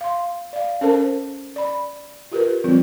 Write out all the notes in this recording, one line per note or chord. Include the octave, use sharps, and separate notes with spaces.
F5 C6
D5 F5
C#4 A4 A#4 C5 A5
D5 B5
F4 G4 A#4 B4
F3 G3 C4 F4